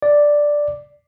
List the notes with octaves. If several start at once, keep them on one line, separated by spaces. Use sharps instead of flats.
D5